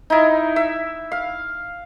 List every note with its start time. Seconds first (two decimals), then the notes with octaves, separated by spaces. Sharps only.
0.10 D#4 E4
0.56 E5
1.12 F5